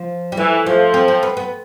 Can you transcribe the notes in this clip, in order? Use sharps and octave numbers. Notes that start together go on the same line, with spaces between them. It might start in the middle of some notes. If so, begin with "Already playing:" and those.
Already playing: F3
G3
E3 A3
F3 A3
C4
C4
B3
B3